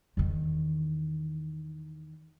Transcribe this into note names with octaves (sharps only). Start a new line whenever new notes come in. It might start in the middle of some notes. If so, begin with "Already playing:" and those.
E2 D#3